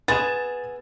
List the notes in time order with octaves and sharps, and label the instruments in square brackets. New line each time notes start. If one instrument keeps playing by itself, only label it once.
[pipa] B3 G#4 [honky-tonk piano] A6 E7